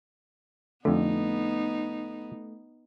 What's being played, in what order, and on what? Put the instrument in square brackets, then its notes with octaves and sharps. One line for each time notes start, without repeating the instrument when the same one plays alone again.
[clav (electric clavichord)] F2 D3 [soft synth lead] A3 [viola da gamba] B3 D#4